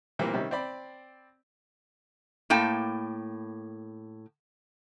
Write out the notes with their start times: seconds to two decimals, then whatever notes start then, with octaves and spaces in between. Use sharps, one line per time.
0.19 A#2 E3 G3 A#3 C4
0.33 C3 D#3 G3 C#4
0.51 C4 D5 B5
2.50 A2 A#3 G5 A5